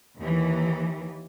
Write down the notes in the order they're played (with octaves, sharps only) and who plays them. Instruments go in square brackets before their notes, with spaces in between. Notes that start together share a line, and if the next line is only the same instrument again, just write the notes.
[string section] D#2 E3